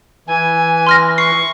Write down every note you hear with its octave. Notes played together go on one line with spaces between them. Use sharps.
E3 G#5
C6 F6 A#6
C#6 C7